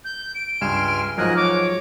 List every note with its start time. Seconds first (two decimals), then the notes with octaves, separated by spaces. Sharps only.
0.05 G6
0.35 D7
0.61 C#2 G2 G#5 C6 F6 E7
1.18 G#2 F3 F#3 A#4 D#5 G#5 F#6
1.36 C#5 D6